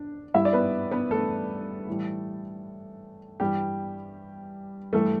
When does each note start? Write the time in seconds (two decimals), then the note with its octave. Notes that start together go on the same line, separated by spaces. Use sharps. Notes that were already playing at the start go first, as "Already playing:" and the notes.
Already playing: D4
0.34 G2 G3 E4 E5
0.45 D5
0.53 B3 B4
0.91 B3 B4
1.11 A3 A4
1.87 A2 E3 G3
3.40 G2 E3 G3 G4
4.93 G2 E3 G3 A3 A4